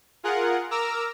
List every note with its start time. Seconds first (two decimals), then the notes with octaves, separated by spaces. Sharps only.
0.24 F4 G#4 A#4 F#5
0.71 A#4 A#5 D6 E6 F6